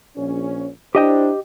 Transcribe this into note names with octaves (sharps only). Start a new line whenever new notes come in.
A#1 C#4
D4 E4 G4 C5 D#5 G5